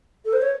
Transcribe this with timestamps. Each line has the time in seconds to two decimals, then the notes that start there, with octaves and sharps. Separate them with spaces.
0.24 A4
0.32 C5
0.41 C#5